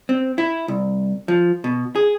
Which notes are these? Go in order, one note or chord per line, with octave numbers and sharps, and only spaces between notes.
C4
E4
C2
F3
B2
G#4